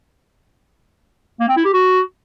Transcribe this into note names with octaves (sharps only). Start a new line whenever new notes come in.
A#3
C4
E4
G4
F#4